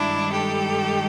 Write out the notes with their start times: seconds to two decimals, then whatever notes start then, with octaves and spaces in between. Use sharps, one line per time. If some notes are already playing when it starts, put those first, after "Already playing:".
Already playing: G2 D#3 G#3 D4 E4
0.32 G4 A4